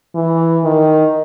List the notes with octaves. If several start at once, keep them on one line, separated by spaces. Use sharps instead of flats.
E3
D#3